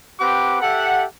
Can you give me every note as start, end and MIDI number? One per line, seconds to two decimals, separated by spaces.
0.20 0.61 60
0.20 0.61 67
0.20 0.61 71
0.20 0.61 78
0.20 0.61 86
0.62 1.05 67
0.62 1.05 69
0.62 1.05 76
0.62 1.05 78